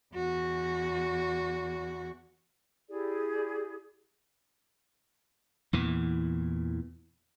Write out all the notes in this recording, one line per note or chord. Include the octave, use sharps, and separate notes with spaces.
E2 F#4
E4 G4 G#4 D5
E2 A#2 E3